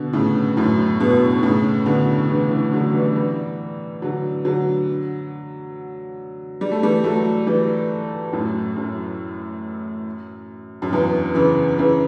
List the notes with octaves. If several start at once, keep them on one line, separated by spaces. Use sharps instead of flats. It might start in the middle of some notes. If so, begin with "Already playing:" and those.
Already playing: B2 D3
A2 C#3
F#2 A2
G2 B2
A2 C#3
B2 D3
C#3 E3
C#3 E3
D3 F#3
E3 G3
E3 G3
D3 F#3
D3 F#3
G3
A3
E3 G3
F#3 A3
E3 G3
F#2 A2
F#2
F#2
E2 G2
C#3 E3
C#3 E3